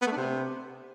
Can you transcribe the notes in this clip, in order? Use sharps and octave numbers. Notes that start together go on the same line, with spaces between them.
B3
A3
D4
C3